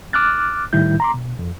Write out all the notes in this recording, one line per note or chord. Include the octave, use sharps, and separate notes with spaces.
D6 F6 F#6 A6
A2 D#3 G3 E4 G6
A#5 C6 D6
B2
F2